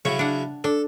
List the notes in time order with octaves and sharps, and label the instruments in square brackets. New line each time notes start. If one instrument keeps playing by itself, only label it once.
[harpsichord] C#3 F#3 E4 [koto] C#5
[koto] D4 F#5
[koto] D4 [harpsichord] A4